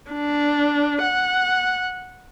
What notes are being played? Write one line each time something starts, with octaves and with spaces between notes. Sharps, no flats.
D4
F#5